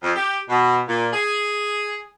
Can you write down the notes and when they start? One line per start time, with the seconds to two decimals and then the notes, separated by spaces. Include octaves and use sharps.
0.03 F2
0.16 G4
0.49 B2
0.88 A#2
1.13 G#4